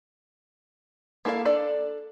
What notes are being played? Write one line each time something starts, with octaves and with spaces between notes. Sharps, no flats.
A#3 E4 A4 C5 F5
D4 A4 D5